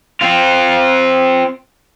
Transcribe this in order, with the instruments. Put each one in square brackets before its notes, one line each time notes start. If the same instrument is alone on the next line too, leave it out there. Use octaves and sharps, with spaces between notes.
[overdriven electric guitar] C4 F4